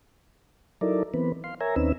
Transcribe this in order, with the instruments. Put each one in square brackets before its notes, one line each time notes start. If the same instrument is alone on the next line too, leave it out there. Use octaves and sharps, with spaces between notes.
[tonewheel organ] F#3 D#4 E4 A4 A#4 D5
E3 B3 C4 B4
F5 C6
A#4 C#5 E5 G#5 A#5
D#2 C4 C#4 D#4 B4 E6